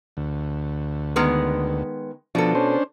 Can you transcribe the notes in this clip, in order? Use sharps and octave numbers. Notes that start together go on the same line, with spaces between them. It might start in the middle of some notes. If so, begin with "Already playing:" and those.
D2
D#3 G#3 B3
B2 F3 D4 A4
C#4 D4 C5